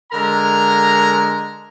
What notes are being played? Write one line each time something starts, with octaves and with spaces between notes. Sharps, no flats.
D3 G#3 A#4 A#5